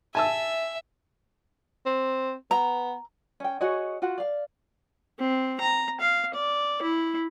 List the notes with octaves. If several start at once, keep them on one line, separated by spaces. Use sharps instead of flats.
E5 G#5 A5 E6
C4
B3 A#5
C#4 G5
F#4 G#4 C#5 D#5
F4 F#4 F#5
D5 F5
C4
A#5
F5
D5
E4